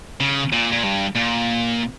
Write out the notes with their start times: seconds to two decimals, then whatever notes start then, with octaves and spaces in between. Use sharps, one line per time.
0.20 C#3
0.52 A#2
0.72 A#2
0.83 G2
1.15 A#2